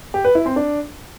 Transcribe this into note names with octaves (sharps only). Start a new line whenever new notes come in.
G4
B4
E4
C4
D4